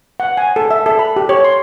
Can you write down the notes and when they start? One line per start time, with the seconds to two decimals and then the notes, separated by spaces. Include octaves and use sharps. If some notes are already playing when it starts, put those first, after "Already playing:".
0.20 F#5
0.37 G#5
0.56 A4
0.71 E5
0.86 A4
0.99 B5
1.16 G4
1.29 C#5
1.44 C6